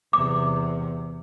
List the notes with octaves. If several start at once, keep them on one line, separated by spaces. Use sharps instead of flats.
E2 C3 D6